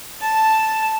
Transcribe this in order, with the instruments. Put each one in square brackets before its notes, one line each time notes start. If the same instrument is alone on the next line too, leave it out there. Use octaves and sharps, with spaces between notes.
[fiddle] A5